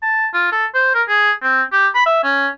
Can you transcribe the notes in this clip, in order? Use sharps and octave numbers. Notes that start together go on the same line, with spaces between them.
A5
F4
A4
C5
A#4
G#4
C4
G4
B5
E5
C#4